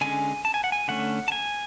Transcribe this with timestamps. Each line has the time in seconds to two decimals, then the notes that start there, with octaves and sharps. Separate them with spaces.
0.01 D3 G#3 C#4 G#5
0.45 A5
0.54 G#5
0.64 F#5
0.72 G#5
0.88 D3 A3 C#4 F#5
1.28 A5
1.32 G#5